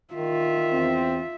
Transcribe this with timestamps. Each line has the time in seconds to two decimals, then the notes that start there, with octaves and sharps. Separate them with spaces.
0.14 D#3 F4 E5
0.72 E2 C4